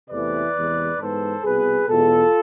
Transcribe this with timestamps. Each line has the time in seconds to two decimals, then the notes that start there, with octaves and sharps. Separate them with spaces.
0.10 E2 C3 E3 A3 B4 D5
0.55 E2 C3 E3 G#3
0.99 G#2 E3 G#3 B3 A4 C5
1.43 C2 B2 B3 G#4 B4
1.87 E2 B2 G#3 F4 A4